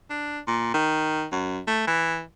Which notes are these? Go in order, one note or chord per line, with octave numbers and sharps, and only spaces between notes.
D4
A#2
D#3
F#2
A3
E3